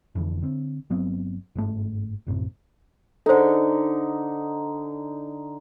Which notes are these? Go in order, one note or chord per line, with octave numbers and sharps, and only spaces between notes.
F1 F2 D3 E3
D3 C4
G1 F#3 B3 C4
G1 G#2 A3
A#1 F#2 A2 C3
D3 D#4 A4 C5